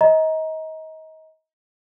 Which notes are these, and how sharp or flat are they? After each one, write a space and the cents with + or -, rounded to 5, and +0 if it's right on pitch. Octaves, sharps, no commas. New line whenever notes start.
D#5 +30 A#5 +15